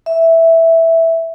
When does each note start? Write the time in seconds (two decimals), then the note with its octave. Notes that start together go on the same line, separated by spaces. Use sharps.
0.06 E5